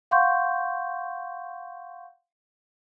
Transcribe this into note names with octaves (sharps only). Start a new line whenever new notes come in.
F5 F#5 C6 C#6 G6